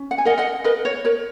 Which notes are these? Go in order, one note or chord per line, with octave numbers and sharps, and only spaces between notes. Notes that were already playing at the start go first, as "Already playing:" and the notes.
Already playing: C#4
F#5
G#5
A#4 D#5 F#5
D#5 F#5
A#4 B4 D#5
C#5
A#4 C#5